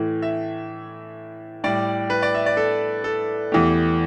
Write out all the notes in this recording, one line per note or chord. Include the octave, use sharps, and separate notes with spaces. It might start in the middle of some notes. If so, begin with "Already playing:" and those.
Already playing: A2 E3 A3
E5
A2 G3 D5
B4
D5
E5
D5
A4
A4
E2 E3 A3 G4